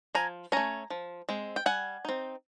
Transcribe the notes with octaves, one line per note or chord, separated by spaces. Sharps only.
F3 G#5 A#5
A3 C#4 G#5 A#5
F3
G#3 C4
G5
G3 F#5 G#5
C4 D#4